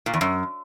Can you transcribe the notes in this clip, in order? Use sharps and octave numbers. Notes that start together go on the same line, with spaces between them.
A#2
E2
F#2